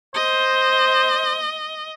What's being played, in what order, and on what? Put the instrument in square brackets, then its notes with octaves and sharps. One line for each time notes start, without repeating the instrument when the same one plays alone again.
[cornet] C5 [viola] D#5